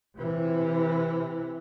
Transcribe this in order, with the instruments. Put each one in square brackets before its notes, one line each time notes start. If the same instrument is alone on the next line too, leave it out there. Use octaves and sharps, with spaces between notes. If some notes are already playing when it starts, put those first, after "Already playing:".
[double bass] C3 E3